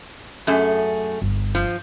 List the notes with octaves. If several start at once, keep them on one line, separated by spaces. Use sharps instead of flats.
F#2 A3 G#4
G1
F3